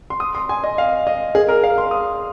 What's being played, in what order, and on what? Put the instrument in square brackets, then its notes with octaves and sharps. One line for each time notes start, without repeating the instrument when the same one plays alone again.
[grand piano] C6
D#6
C6
G#5
D#5
F5
D#5
G#4
A#4
F5
C6
D#6